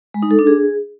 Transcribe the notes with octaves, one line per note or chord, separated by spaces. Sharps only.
G#3
D#4
A4
D4
G#4